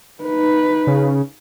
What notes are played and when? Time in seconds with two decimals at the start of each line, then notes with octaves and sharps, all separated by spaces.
0.23 D#4 B4
0.87 C#3